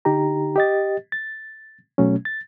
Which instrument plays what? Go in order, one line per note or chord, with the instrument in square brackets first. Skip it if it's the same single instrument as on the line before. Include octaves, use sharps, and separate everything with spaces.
[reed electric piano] D3 D#4 G4 A#5
G4 D#5 A6
A6
B2 F#3 A3 C#4
A6